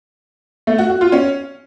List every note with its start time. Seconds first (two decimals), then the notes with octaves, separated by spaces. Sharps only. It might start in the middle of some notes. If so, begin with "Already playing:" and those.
0.67 A3
0.78 F#4
0.90 F#4
1.01 F4
1.12 C#4